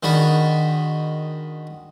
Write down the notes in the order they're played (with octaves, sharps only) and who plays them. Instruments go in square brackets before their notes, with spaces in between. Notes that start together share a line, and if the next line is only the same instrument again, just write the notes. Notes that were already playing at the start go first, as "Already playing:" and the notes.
[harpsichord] D#3 G#3 D4 F#4 B5 C#6